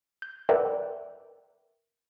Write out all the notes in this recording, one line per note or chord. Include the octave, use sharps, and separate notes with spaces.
G6
A#4 B4 D5 E5 F#5 G5